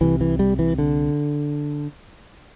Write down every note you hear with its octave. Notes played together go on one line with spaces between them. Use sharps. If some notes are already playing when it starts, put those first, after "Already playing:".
C2 C3 E3
E3
G3
E3
D3